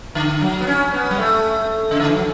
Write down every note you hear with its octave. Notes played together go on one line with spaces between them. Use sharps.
D3
F#3
B3
C#4
B3
G3
A3
C#3
D3
E3
F#3